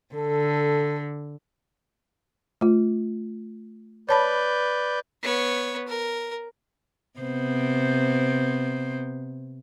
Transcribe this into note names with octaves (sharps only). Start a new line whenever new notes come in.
D3 A4
A3 F4
B4 C#5 D5 A5 B5 G6
B3 C#5
A#4
C3 B3 C5